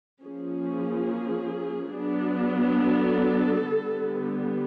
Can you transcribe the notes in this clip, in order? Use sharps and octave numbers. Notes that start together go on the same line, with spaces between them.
F3 A#3 C#4 G#4
F#3 B3 D4
A4
D3 G3 B3